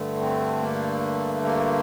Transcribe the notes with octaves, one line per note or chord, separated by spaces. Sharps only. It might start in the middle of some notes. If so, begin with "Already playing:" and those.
Already playing: G2 D3 A3
C4
A#3
A#3